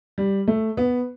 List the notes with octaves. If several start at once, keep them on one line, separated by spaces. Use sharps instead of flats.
G3
A3
B3